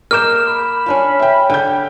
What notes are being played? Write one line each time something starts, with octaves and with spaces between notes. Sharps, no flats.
A#3 A#4 D#5 D6 F6 G6 E7
B5
C#4 D4 F4
E5 G5
D3 G5 G6